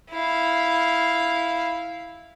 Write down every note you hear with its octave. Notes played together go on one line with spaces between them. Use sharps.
E4 F5